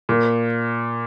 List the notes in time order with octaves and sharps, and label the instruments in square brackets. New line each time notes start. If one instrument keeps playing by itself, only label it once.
[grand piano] A#2